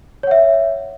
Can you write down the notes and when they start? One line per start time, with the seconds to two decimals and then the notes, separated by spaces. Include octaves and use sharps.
0.23 C#5
0.27 F#5
0.31 E5